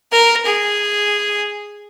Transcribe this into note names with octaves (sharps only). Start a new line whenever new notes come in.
A#4
G#4